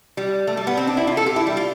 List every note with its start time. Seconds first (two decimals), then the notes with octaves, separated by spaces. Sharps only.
0.17 G3
0.47 A3
0.57 G3
0.67 B3
0.77 C4
0.87 D4
0.97 E4
1.07 F4
1.17 A4
1.26 G4
1.36 E4
1.47 G3
1.57 F4